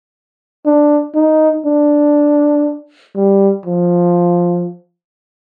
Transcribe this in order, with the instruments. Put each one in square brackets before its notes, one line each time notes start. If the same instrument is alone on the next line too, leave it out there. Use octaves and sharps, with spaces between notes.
[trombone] D4
D#4
D4
G3
F3